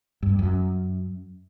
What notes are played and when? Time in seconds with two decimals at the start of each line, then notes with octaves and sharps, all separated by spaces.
0.23 G2
0.39 F#2